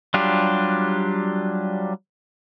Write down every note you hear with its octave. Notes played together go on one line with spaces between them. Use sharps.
F#3 G3 D4 F4 G4